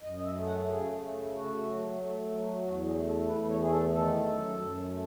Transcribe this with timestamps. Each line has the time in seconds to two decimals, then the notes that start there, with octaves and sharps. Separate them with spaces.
0.02 F#2 D#5
0.16 D#5
0.24 E5
0.35 A3
0.46 F#5
0.67 C#3 G#4
0.99 A3
1.32 A3 F#4
1.65 F#3
1.97 A3
2.30 F#3
2.62 E2 F#4
2.85 G#4
2.94 A3
3.06 A4
3.27 E2 B4
3.48 C#5
3.59 A3 G#4
3.71 A4
3.93 D#3 A4
4.25 F#2
4.58 F#2
4.89 A3